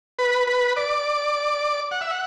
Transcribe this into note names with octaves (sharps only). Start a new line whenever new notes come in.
B4
B4
D5
F#5
E5
F#5